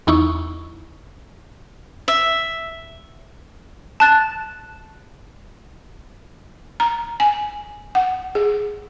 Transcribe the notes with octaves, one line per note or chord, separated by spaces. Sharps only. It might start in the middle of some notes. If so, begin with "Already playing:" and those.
E2 D#4 E4 C#6
E5
A5 F#6 A6
A#5
G#5
F#5
G#4